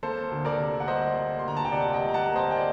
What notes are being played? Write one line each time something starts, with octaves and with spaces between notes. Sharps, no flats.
A#3 A4 C5
D2
A#4 D5
C3
F#5
G3 C5 D#5
A#3
C6
D2 A#5
A5
G5
C3 D5 F#5
D#5 G5
G3
A#5
F#5 A5
A#3
C5 D#5
G5
D5